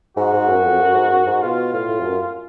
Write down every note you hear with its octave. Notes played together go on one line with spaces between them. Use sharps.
G#2 F#4
G#2
F#2
F2
F#2
G#2
F#2
G#2
B2 F4
A2 F4
A2
F2
F#2